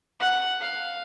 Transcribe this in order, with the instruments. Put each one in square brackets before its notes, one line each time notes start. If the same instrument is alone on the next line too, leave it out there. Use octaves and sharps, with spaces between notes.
[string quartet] F#5
F5